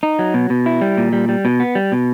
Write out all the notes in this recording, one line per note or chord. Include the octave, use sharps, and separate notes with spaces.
D#4
F#3
B2
B2
E4
G3
A#2
G3
G3
B2
B3
G3
B2